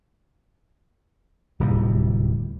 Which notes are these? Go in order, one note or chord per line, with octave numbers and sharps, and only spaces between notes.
D1 D#2 C3 G3